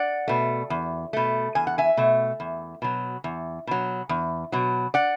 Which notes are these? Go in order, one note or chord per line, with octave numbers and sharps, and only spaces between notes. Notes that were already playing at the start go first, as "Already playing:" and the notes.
Already playing: D5 F#5
B2 A3
E2
B2 A3
E2 G#5
F#5
E5 G#5
B2 A3
E2
B2 F#3
E2
B2 F#3
E2
B2 F#3
D5 F#5